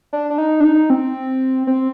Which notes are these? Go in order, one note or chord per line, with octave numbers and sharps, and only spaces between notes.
D4
D4
D#4
D4
D#4
C4
C4